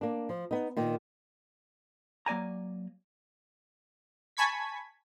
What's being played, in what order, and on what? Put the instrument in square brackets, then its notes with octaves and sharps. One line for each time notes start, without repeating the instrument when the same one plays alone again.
[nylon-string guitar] A#3 D4
F3
B3 D#4
A#2 D#3
[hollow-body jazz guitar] F#3 A#3 D5 G#5 A#5
[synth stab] G#5 A5 B5 C#6 G#6 B6